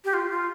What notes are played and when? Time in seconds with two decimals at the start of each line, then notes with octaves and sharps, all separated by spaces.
0.05 G4
0.14 F4
0.30 F4